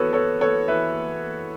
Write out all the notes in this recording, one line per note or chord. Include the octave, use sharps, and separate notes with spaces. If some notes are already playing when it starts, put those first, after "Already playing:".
Already playing: E3 B3 F#4 A4 B4 C#5
B3 A4 C#5
B3 A4 C#5
E3 B4 E5